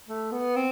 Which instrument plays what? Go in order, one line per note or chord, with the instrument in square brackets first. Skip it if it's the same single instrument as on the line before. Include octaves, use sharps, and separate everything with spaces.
[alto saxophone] A3
B3
C4